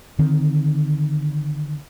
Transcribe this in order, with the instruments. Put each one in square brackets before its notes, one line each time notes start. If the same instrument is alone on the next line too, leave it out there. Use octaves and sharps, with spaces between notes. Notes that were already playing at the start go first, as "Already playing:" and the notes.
[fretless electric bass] D3 D#3 C4